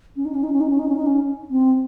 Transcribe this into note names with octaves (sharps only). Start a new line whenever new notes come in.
C#4
D#4
C#4
D#4
C#4
D#4
C#4
D#4
C#4
D#4
C#4
C4